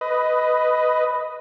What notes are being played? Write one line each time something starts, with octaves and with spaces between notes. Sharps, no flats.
B4 D#5